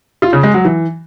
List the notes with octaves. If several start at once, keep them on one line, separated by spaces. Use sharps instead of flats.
F4
C#3
G#3
F#3
E3